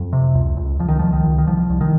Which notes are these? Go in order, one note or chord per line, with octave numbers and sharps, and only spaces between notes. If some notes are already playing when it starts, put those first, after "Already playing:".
Already playing: F2 F#3
C3
C#2
C#2
C#2 F3
D#3
C#2 F3
D#3
C#2
D#3
C2 F3
C2
D#3